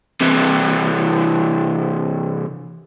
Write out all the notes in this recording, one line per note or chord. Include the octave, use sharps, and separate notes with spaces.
C3 E3